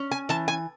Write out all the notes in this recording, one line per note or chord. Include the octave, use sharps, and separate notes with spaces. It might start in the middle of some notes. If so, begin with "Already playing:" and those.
Already playing: C#4
G#5
E3 A5
G#5